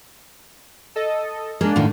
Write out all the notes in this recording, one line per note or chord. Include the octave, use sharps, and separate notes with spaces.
A4 D#5
G#3 A#3 D4
F#2 A2 D#3